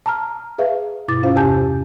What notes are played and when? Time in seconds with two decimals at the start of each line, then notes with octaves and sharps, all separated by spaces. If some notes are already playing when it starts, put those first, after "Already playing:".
0.06 A5 A#5 F6
0.58 G#4 B4 E5 F5
1.08 G2 B2 E4 D6 A6
1.23 C#4 F4 C5 F5
1.35 E2 C3 G4 G#5 A5 G6